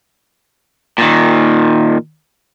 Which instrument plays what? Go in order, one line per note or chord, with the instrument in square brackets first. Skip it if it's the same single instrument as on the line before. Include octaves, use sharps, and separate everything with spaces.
[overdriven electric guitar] A#2 D#3